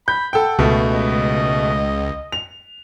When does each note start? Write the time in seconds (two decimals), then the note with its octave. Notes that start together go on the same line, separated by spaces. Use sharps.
0.08 B5 G6
0.33 A4 F#5 G5
0.59 C#2 B2 A3
0.91 D#5
2.32 F7